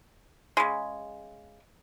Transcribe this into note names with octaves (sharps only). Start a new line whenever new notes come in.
C#3 G#3